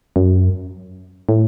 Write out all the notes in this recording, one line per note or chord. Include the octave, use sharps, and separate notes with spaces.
F#2
A2